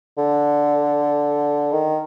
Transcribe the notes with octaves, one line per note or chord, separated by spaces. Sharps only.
D3
D#3